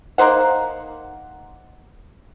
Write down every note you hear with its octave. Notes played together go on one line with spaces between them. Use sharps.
A#3 D#4 C5 F#5